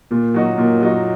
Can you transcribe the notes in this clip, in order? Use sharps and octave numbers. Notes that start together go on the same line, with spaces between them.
A#2 A#3
F#3 D#4 F#4
A#2 A#3
F#3 D#4 F#4